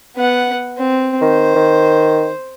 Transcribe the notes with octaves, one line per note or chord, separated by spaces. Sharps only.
B3 F#5
C4
D#3 C5
D#3